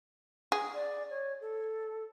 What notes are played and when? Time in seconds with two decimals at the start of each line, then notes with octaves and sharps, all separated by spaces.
0.52 G#4
0.74 D5
1.10 C#5
1.41 A4